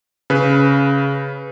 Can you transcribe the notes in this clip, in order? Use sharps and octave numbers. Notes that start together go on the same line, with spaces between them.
C#3 B4